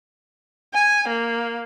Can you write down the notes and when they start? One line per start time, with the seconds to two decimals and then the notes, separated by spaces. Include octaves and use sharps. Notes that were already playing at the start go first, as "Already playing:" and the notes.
0.74 G#5
1.08 A#3